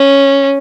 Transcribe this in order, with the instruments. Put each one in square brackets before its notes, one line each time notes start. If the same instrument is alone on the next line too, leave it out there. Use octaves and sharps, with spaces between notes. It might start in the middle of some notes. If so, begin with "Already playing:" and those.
Already playing: [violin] C#4